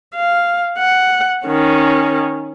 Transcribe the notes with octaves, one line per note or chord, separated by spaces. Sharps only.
F5
F#5
D#3 C#4